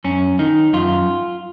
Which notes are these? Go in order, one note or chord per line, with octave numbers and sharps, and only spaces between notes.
F#2 C#4
D#3 D#4
F#2 F4